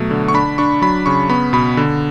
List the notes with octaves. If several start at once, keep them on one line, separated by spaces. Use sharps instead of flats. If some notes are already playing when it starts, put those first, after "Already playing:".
Already playing: B2 F#3 A3
D3
C#6
D4 B5
D4 C#6
F#3 B5
C#3 C#6
B3 B5
B2 B5
D3